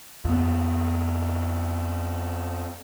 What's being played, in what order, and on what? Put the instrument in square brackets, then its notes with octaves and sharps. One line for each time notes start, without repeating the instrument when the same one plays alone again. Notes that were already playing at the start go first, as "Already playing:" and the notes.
[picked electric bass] F2 B3